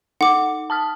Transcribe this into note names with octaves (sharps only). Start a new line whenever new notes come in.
D#4 F#5 D6
A5 D#6 F6